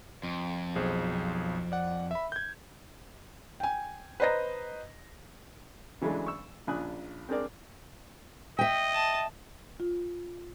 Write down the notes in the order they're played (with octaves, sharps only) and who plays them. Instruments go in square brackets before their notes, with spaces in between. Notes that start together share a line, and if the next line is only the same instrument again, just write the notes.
[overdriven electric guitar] F2
[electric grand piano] B1 G#4 C5
D5 F#5
E5 B5
G6 G#6
[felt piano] G5 G#5
B4 C5 D#5 A#5 A#6
[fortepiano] C#3 E3 F#3 G#3 A3 D4
C#6 E6
A#1 C#3 D4 G#5 D#6 F#6
C4 D4 G#4 A#4 D5
[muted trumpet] D#5 [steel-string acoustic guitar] E5 G5
[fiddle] A5
[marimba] F4